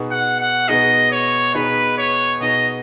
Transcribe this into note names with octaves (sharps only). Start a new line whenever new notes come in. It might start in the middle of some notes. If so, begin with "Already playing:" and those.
Already playing: B2 B3 D#4 G#4
F#5
F#5
B2 B3 D#4 G#4 D#5
C#5
B2 B3 D#4 G#4 B4
C#5
B2 B3 D#4 G#4 D#5